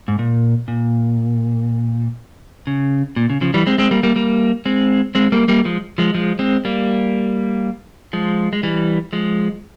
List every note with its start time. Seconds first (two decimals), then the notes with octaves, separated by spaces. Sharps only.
0.08 G#2
0.19 A#2
0.68 A#2
2.67 C#3
3.16 A#2
3.30 C#3
3.41 C#3 F3
3.54 E3 G3
3.67 G#3 C4
3.78 G#3 C4
3.91 G3 A#3
4.03 G3 A#3
4.16 G3 A#3
4.65 G#3 C4
5.15 G#3 C4
5.32 G3 A#3
5.48 G3 A#3
5.65 F3 G#3
5.98 F3 G#3
6.14 F3 G#3
6.39 G#3 C4
6.65 G3 A#3
8.13 F3 G#3
8.53 G#3
8.63 E3 G3
9.13 F3 G#3